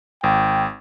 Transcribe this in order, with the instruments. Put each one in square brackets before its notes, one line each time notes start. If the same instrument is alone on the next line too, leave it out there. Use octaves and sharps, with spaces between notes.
[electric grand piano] G#1 [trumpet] G5